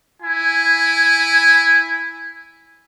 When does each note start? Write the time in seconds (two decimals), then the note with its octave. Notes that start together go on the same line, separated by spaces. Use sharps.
0.22 E4 G#5